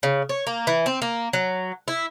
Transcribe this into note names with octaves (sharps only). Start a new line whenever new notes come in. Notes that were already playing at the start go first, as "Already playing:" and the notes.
C#3
C#5
A#3
E3
C4
A#3
F#3
E4